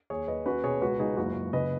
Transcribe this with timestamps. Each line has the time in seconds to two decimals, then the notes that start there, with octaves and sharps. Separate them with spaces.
0.10 D#2 G#4 C#5
0.28 D#2 B4 D#5
0.46 C#4 F#4 B4
0.63 B2 G#4 C#5
0.81 C#2 F#4 B4
0.99 C#2 D#4 G#4
1.17 F#1 F#4
1.35 F#1
1.53 C#3 B4 D#5